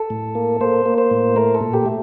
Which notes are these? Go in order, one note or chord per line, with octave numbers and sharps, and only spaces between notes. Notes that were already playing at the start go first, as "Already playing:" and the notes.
Already playing: A4
A2
A#3
A#3 C5
A#3
C5
A2
A3 A#4
A4
A#2
G4
A3